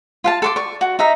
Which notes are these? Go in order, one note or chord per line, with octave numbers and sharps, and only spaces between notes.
F4 F5 A5
A4 C6 D6
D5 C#6
F#4
D#4 E5 A#5